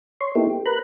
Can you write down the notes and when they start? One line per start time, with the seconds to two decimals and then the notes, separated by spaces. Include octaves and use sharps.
0.21 C#5 C6
0.35 A#3 B3 D#4 E4 G4 A4
0.50 G4
0.66 A#4 B4 A#5 B5 F#6